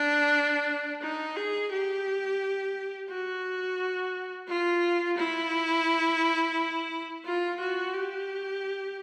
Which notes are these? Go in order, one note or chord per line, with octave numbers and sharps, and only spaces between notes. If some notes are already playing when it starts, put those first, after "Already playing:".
Already playing: D4
D#4
G#4
G4
F#4
F4
E4
F4
F#4
G4